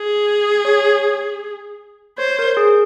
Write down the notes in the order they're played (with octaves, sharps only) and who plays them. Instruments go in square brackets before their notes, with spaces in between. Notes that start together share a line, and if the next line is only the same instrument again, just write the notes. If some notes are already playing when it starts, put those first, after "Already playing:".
Already playing: [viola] G#4
[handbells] C#5
[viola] C5 [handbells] C#5
[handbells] A#4
G#4